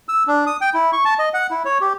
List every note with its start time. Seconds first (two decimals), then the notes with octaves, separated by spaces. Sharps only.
0.09 E6
0.27 D4
0.46 D#6
0.61 G5
0.74 E4
0.93 C#6
1.05 A5
1.19 D#5
1.34 F#5
1.51 E4
1.65 C#5
1.81 G4